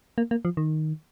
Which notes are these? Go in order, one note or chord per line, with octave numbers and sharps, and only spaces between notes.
A#3
A#3
F3
D#3